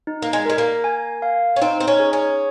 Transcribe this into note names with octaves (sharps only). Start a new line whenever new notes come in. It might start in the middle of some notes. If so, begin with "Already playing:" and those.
D#4
A#3
G#3
G#3 A#4
A#3
G#5
F5
C#4
C4 D#4
C4
C#4
G#4
C#4